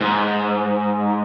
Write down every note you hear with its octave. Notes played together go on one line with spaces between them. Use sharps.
G#2